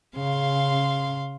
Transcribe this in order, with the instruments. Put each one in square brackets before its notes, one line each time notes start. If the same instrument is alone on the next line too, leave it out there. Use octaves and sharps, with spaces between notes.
[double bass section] C#3 [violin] F5 C6